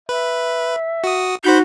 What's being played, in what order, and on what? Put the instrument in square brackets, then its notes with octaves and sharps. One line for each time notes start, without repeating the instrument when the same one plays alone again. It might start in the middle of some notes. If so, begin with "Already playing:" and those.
[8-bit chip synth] B4 [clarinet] E5
[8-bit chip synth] F#4 D#6
[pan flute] D#4 [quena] F#4 [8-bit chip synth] C5 B5 G6